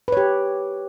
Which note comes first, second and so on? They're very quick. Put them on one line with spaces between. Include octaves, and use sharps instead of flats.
B4 C#5 G4